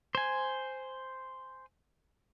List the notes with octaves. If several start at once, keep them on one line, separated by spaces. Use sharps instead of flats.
C5 G#5